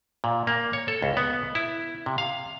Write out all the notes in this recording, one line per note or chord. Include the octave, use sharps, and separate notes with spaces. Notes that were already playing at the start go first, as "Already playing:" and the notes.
A#2
A#3
C#5
A4
C#2
B3
E4
C3
F5